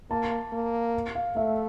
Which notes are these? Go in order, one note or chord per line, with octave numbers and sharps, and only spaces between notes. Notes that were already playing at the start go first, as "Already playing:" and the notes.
A#3 A5
A#3
F5
A3 E5